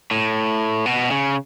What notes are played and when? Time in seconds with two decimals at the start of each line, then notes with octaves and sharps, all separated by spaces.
0.11 A2
0.86 B2
1.11 C#3